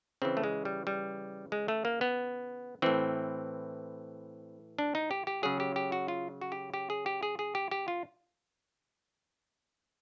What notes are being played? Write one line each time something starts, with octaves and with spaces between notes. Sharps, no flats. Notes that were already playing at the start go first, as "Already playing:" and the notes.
C#3 E3 C4
A3
G#3
G3
G3
G#3
A3
A#3
B3
A2 E3 C4
D4
D#4
G4
G4
C#3 F#3 G#4
G4
G4
F#4
F4
F#4
G4
G4
G#4
G4
G#4
G#4
G4
G4
F4